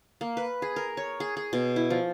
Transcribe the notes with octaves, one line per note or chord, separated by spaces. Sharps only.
A#3
B4
G#4
A#4
C#5
G#4
G#4
B2
E4
F3